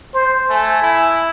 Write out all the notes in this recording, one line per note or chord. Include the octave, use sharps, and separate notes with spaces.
C5
A3 G#5
E4